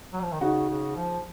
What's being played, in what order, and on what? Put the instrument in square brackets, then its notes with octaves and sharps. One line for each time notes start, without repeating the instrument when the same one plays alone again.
[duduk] F#3
F3
D#3
[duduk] C#3 [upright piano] D#4 F#4
[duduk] C#3
F3